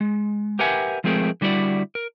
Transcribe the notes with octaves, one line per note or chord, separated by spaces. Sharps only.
G#3
G4 A#4 B4 E5 F#5 G#5
F3 G#3 A3 C4 G#4 A#4
D3 G3 E4 F#4 D5
A#4